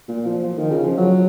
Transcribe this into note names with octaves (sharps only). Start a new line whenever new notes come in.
A#2
F3
F3
D#3
C#3
F3
F#3